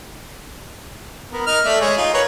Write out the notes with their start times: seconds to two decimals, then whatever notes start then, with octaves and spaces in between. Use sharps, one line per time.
1.32 B3 A#4
1.47 D#4 A#4 F6
1.65 A3 D5 E5
1.81 G#3 G#4 C#5
1.97 D#4 F4
2.14 A#4 B4 C#5